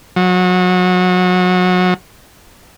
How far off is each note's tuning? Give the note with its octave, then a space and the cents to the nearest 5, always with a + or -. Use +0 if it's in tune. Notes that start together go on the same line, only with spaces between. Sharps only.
F#3 -30